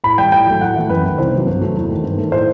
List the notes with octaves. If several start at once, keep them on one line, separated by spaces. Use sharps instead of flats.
A2 B5
G3 G5
A2 G5
F#3 A3
A2 F#5
E3 A3
F#2 B4
D#3 A3
C2 C5
C3 F#3
G2
F#3 A3
E2
D#3 A3
G2
D#3 A3
A2 C5